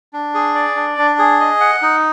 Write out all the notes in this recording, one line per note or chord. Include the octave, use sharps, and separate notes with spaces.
D4
G#4
D5
D4
D4
G#4
D#5
F#5
D#4